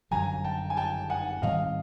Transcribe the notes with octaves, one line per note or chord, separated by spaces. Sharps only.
G1 F#2 D3 F#3 G#5 A#5
G5 A5
G#5
G5 A5
F#5 G#5
G#2 D#3 G3 C4 D#5 F5